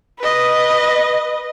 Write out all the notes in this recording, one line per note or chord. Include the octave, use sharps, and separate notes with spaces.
B4 D#5